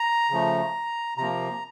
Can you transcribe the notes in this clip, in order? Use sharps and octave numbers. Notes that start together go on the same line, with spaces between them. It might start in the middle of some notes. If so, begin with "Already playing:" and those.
Already playing: A#5
C#3 F3 A3
C3 F3 A#3 A#5